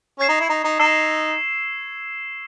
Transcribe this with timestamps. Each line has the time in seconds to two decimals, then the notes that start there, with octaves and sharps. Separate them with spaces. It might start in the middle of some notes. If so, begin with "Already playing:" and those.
0.19 C#4 C#6 G#6 C7 E7
0.29 D#4
0.40 E4
0.49 D#4
0.64 D#4
0.79 D#4 E6 C7 E7